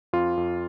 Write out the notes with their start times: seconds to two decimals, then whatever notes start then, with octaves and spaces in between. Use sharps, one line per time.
0.13 F2 F4
0.37 F2